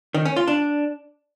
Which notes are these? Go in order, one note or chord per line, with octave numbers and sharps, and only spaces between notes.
D#3
C#4
F4
D4